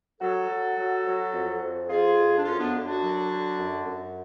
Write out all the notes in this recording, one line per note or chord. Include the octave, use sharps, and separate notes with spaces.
F#3 F#4 A4
F#3
F#3
F#3
F2
F2
F2 F4 G#4
F2
D4
F#2 C#4 F4
B3 D4
D3
D4 F#4
F#3
D3
F#2
F#2